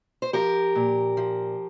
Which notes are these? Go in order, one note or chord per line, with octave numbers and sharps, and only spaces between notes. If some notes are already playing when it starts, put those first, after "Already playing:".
C5
F3 G4 A#4
A#2
F3